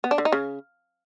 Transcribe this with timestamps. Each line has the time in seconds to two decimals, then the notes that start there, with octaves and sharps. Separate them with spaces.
0.04 B3
0.11 D4
0.18 D3
0.25 D#4
0.32 C#3